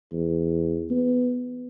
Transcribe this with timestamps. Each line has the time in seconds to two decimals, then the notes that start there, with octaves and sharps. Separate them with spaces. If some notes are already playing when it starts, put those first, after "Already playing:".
0.12 E2
0.91 B3